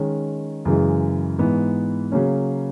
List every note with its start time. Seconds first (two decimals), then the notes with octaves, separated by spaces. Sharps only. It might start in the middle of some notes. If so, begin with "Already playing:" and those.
Already playing: D#3 G#3 C#4
0.65 F#2 C#3 E3 G#3
1.38 G#2 E3 B3
2.12 C#3 F#3 A#3 C#4